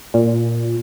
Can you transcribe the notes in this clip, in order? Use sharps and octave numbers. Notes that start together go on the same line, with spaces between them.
A#2